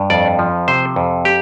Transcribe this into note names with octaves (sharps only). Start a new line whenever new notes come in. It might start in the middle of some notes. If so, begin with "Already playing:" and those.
Already playing: G2
F2 D5
F3
C3 C5
F2
G4